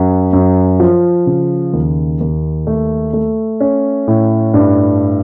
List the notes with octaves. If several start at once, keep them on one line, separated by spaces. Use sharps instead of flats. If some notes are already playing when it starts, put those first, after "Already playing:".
Already playing: F#2
F#2
F3
C#3
D#2
D#2
A3
A3
C#4
A2
G2